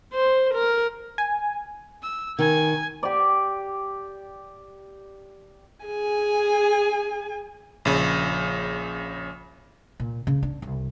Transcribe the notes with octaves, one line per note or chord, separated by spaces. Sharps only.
C5
A#4
G#5
E6
D#3 G#5 G#6
G4 D5
G#4 G#5
A#1 C#3
A#2
C#3
D4
C2